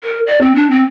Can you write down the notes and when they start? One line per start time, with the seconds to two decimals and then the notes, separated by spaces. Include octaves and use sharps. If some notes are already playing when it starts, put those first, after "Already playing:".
0.04 A#4
0.27 D5
0.41 C4
0.55 D4
0.71 C4